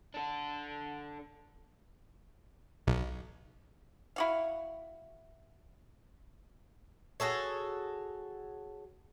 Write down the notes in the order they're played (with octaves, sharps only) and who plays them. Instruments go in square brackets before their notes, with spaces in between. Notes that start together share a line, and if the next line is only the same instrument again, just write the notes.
[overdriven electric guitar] D4 A4
[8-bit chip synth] B1
[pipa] E4 F#4 F5
[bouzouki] F#4 G#4 A4 C#5